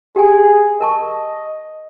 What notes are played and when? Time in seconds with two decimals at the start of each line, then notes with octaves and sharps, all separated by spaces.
0.16 G4 G#4 G5 G#5
0.81 A#4 D#5 A5 C#6